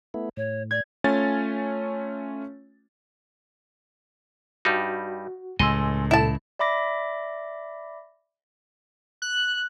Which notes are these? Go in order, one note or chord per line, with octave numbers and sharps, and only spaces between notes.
A3 B3 E4
A2 C#5
D5 G#6
A3 C#4 F4 C#5 G#5 A6
G2 G3 D#4 F#4
C#2 A2 D#5 G#5 C6 E6
A#2 E4 A4 A5
D5 E5 B5 D6 A#6
F#6